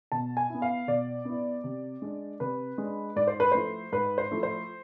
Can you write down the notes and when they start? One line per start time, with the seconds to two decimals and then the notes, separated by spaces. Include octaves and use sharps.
0.12 B2 A5
0.37 G#5
0.50 B3 E4
0.62 F5
0.87 B2 D5
1.25 B3 E4
1.64 C3
2.02 G#3 D4
2.40 C3 B4
2.78 G#3 D4
3.16 G#2 D5
3.27 C5
3.40 B4
3.52 F3 A3 E4 C5
3.92 G#2 B4
4.18 C5
4.31 F3 A3 E4
4.43 C5